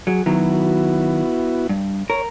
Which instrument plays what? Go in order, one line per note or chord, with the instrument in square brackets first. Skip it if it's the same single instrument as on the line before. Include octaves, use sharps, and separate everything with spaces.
[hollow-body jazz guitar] F#3 [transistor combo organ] G#4
[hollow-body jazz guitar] D#3 F#3 [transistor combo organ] B3 E4 F#4
[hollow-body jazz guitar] G2
[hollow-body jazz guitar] A#4 [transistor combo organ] C#5